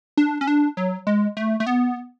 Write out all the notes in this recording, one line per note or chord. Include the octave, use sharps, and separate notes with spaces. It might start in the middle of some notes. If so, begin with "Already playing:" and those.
D4
C#4
D4
F#3
G#3
A3
A3
B3